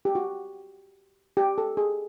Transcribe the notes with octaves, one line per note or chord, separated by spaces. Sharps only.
G4
F#4
G4
A4
G#4